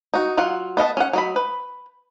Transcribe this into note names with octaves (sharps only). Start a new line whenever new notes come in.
D#4 F#4
F#3 F4 F#5
B3 D#5 F5 A5
C#4 F#5
F#3 D#5 B5
B4